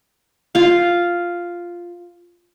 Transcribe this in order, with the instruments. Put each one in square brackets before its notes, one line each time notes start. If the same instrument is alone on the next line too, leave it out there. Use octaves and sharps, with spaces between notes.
[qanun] F4 F5